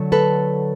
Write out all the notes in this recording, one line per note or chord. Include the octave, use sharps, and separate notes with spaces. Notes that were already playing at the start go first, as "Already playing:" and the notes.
Already playing: D3 F#3 A3
A4 B4